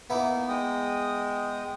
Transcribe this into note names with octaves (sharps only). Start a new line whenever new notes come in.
A#3 B3 D#4 E4 D6
G#3 G5 D#6